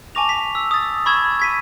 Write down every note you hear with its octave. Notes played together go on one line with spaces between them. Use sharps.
G#5 A5 C#6 D6 A#6 F7
B6
E6
D#6 A6
B5 C#6 E6 G#6 E7
G#6 B6 D#7